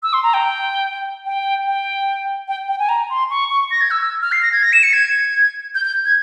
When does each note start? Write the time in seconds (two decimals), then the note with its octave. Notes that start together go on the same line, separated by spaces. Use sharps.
0.03 E6
0.13 C6
0.23 A#5
0.34 G5
1.26 G5
1.66 G5
2.48 G5
2.68 G5
2.79 G#5
2.89 A#5
3.10 C6
3.30 C#6
3.50 C#6
3.71 A#6
3.81 G#6
3.91 E6
4.01 E6
4.22 F6
4.32 C7
4.42 A#6
4.52 G#6
4.63 A#6
4.73 E7
4.83 C#7
4.93 G#6
5.75 G6
5.85 G6
6.05 G#6